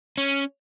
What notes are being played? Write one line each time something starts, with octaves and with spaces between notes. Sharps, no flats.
C#4